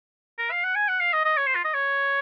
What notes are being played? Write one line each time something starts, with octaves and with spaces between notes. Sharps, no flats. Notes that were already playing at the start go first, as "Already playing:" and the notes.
A#4
F5
F#5
G#5
F#5
F5
D#5
D#5
C#5
C5
F4
D#5
C#5